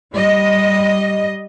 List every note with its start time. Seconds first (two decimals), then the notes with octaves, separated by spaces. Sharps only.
0.13 G3 D#5